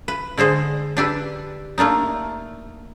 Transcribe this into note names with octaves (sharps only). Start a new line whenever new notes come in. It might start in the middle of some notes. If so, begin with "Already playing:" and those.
B4
D3 G#3 C5 D#5
D4 G4 A4 B4
A3 A#3 D4 D#4